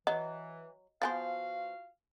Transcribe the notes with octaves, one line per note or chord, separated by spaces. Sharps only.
E3 F#3 D#5
F3 B3 F4 F#4 C5 F5 G#5 A6